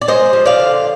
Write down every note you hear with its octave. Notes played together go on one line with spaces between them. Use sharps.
D5
G#3 C5 D#5
F3
D5 F5
D3